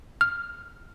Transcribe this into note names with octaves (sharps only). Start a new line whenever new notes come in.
F6